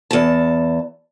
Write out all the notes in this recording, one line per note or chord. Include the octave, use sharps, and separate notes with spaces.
E2 A5